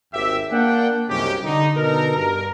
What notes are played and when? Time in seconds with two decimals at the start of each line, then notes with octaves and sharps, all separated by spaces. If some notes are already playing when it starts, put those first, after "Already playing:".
0.13 G#1 D#2 G4 E5
0.51 A#3 D4 F#5 G5
1.09 C2 F#2 C#3 C#4 D#4 G4
1.44 D3 D#4
1.75 B2 D3 D#4 A4 A#4
2.16 G2 A#4